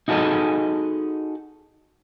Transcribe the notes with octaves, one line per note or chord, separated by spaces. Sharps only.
D#4 F#4 G#4 A4 D#5